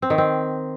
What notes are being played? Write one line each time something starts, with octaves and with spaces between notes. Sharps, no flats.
C4
D#3
C4